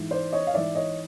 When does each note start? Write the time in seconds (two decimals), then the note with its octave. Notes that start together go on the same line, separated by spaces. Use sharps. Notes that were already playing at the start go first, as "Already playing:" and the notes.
Already playing: G#2 E3
0.11 C5 D5
0.33 C#5 D#5
0.47 F5
0.54 G#2 E3 D5 E5
0.75 C#5 D#5